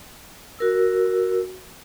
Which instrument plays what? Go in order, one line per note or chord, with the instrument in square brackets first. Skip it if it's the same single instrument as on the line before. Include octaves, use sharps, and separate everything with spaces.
[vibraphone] F#4 A#4 E6